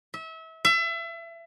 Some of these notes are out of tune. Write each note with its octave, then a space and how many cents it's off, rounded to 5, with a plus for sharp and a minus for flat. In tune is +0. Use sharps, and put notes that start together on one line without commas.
E5 -30
E5 +30